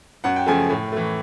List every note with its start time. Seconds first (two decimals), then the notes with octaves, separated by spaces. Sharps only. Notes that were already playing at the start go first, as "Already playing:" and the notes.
0.24 F#2 F#5
0.36 G5
0.46 C#3 F3 A3 G#5
0.70 A2
0.92 E3 A3